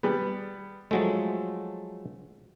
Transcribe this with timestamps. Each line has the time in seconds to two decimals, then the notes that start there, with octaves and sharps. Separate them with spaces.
0.03 G3 B3
0.91 F3 F#3 G#3 A3